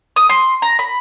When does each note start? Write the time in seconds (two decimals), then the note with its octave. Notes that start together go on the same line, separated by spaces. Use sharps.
0.16 D#6
0.30 C6
0.62 A#5
0.79 B5